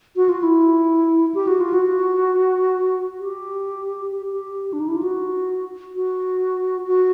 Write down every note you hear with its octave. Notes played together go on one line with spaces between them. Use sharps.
F#4
F4
E4
G4
F#4
F4
F#4
G4
G4
G4
D4
D#4
E4
F4
F#4
F#4
F#4